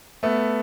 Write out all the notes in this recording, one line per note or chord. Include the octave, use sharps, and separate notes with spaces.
A3 B3